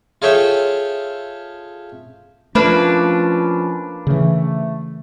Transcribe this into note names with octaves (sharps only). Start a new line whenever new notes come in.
F4 G#4 A4 C#5 E5 G5
F3 A3 A#3 C#4 D4 F4 B4
C#3 E3 A3